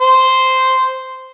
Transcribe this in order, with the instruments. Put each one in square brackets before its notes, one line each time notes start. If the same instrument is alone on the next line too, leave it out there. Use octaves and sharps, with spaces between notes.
[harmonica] C5